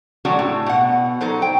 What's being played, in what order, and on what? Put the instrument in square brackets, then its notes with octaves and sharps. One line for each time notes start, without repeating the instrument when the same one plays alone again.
[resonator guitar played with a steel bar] F#3 G#3 A3 D4 F#4 G4
A2
B2 F#5
F#3 D#4 A4 C5
G5